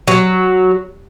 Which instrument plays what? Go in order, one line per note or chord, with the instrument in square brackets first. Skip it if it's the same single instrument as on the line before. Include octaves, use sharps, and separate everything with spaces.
[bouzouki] F#3